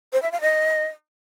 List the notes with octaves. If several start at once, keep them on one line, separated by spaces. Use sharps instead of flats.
C5
E5
F5
D#5